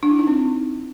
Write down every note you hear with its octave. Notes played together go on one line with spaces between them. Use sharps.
D4
E4
D#4
C4